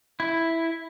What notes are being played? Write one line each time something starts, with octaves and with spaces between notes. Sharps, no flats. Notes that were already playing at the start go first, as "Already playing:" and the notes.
E4